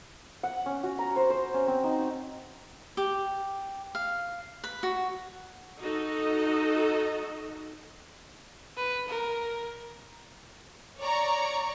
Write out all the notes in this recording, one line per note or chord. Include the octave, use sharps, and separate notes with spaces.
F#5
C#4
F#4
A#5
C5
C5
C#4
C4
D#4
G4
F5
B4
F#4
D#4 F#4 A4 D#5
B4
A#4
C#5 D5 A#5 C#6